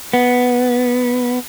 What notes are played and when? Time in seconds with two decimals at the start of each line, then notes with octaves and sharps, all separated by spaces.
0.13 B3